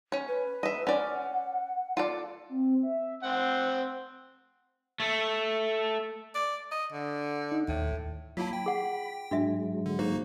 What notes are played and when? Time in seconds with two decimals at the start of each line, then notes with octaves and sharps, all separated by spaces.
0.12 C#4 C#5
0.28 B4
0.63 D#5 E5
0.87 C#4 D5 F#5
1.97 F4 A4 D5
2.49 C4
2.83 E5
3.23 C4 C5 F#5
5.00 A3
6.35 D5
6.72 D#5
6.92 D3
7.52 D#4
7.68 D#2 A2
8.37 F#3 A#3 E4 F4 A5 B5
8.53 G5
8.66 G#4 F#5
9.31 G#2 F#3 G#3 D4 F#4 E5
9.86 D3
9.99 A#3 D#4 F#4 C5